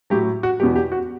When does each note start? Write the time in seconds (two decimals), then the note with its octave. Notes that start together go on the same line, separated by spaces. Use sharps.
0.10 A2 F#3 G4
0.43 F#4
0.60 E2 B2 F#3 G4
0.76 G4
0.92 F#4